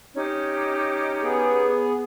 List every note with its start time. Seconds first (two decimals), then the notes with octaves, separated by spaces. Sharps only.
0.15 C#4 D#4 G4
1.22 B3 G#4